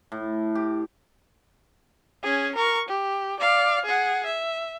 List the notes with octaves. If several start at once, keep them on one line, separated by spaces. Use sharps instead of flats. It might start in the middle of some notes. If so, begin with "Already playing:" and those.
A2
G4
C#4 G#4
A#4 C#6
G4
D5 F5
G#4 F#5
E5